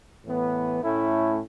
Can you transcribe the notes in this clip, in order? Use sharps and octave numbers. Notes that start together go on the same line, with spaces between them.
A2 E3 B3
A2 A3 C#4 E4